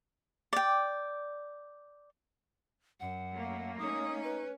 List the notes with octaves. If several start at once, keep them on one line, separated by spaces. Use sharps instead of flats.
D5 G5
F#2 F#5
A3 A#3
C#4 D#4 D#6
B4